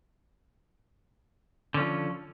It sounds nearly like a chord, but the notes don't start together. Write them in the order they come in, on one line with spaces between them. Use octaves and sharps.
D3 C#4 F3